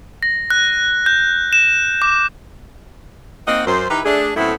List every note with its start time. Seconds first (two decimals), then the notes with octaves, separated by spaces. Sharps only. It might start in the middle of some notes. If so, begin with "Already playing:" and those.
0.23 A#6
0.50 F#6
1.06 G6
1.53 E7
2.02 D6
3.47 A#3 C4 D#4 D#5 F#5
3.66 F#2 C5
3.90 D#3 D#4 E4 G4 B4
4.05 A3 D4 G#4
4.36 F#2 A2 A3 B3 C4 E4